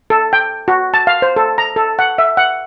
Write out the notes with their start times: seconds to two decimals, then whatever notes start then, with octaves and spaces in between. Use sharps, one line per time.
0.10 A4
0.33 G5
0.68 F#4
0.94 A5
1.07 F5
1.22 C5
1.36 A4
1.58 A#5
1.76 A4
1.99 F#5
2.18 E5
2.37 F#5